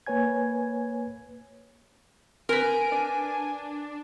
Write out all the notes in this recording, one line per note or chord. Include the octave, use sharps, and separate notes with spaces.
A#3 B4 C#5 G#5 G#6
C4 A#4 B4 G#5
D7
D4